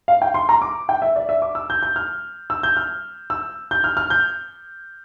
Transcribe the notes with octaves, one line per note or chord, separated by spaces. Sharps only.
F5
G5
C6
A#5
D6
G5
E5
D5
E5
D6
E6
G6
G6
F6
E6
G6
F6
E6
G6
F6
F6
G6